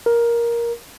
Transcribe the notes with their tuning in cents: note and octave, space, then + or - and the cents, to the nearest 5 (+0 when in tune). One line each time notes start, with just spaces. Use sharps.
A#4 +10